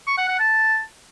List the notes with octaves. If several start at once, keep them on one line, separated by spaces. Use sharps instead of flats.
C#6
F#5
F#5
A5